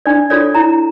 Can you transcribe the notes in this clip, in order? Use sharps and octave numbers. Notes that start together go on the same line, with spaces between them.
D4 D5
F4 A4 C#5 D5
E4 A#5